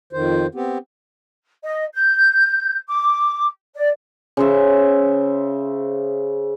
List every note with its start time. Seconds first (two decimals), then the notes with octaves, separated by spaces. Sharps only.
0.13 F2 D#3 C5
0.55 B3 C4 G4
1.63 D#5
1.93 G6
2.88 D6
3.75 D5
4.37 C#3 C5 E5